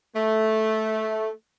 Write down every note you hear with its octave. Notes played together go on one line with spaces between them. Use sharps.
A3